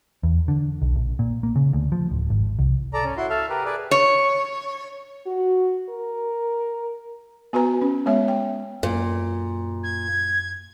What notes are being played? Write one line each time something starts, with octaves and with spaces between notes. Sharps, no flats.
E2
D3
B1
A#1
A#2
A#3
C#3
D2
F3
D1
G#1
C2
A4 D5 A#5
C#4
E4 F#4 C6
A4 E5 F5
G4 A#4 B4
G#4 B4 D5
C#5
F#4
A#4
B3 F#4 B4 G#5 A#5
C#4
G#3 B3 C#5 E5
G5
F#2 A#2 A#3
G#6